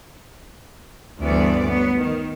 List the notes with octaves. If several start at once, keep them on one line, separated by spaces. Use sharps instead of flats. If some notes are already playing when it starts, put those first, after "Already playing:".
D2 G2 E3 B3 D5
F#3 B3
D#3